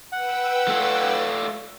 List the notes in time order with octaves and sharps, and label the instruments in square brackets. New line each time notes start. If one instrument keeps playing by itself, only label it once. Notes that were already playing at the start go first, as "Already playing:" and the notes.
[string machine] B4 G5 E6 [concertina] F#5
[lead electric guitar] A3 F4